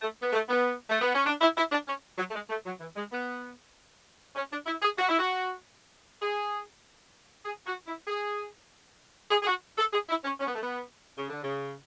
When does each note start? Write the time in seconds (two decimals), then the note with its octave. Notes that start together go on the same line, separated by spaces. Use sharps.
0.02 A3
0.22 B3
0.33 A3
0.48 B3
0.90 A3
1.01 B3
1.14 C#4
1.26 D4
1.41 E4
1.57 E4
1.72 D4
1.88 C#4
2.18 F#3
2.29 A3
2.34 G#3
2.49 A3
2.65 F#3
2.80 E3
2.96 G#3
3.11 B3
4.36 C#4
4.51 D4
4.66 E4
4.82 G#4
4.97 F#4
5.09 E4
5.19 F#4
6.21 G#4
7.45 G#4
7.66 F#4
7.87 E4
8.08 G#4
9.31 G#4
9.43 G#4
9.47 F#4
9.78 A4
9.93 G#4
10.09 E4
10.24 C#4
10.40 C#4
10.47 B3
10.55 A3
10.62 B3
11.17 C#3
11.30 D3
11.42 C#3